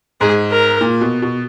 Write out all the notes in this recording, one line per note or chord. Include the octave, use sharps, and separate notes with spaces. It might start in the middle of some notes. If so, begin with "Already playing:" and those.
G#2 G#4
A#4
A#2
B2
B2